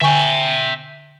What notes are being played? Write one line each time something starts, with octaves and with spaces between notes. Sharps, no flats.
D3 E5 G5 G#5 C#6